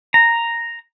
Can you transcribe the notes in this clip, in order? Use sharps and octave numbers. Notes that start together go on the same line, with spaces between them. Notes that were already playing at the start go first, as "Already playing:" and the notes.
A#5